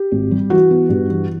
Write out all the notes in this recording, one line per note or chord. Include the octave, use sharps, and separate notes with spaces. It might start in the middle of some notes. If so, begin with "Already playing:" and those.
Already playing: G4
G#1
G3
E3 F#4
B3
G2
E3